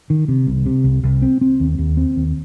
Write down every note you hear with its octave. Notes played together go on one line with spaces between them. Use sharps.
D#3
C3
C2
C3
C2
C2
C4
C4
D#2
D#2
C4
D#2